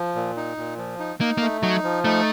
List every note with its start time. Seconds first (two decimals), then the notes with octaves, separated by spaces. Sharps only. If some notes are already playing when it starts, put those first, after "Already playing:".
Already playing: F3
0.15 A#2
0.36 D#4
0.57 A#2
0.78 F3
0.99 D#4
1.20 A#3 D#4
1.38 A#3
1.42 A3
1.62 F#3 D#4
1.83 F3
2.05 A3 D#4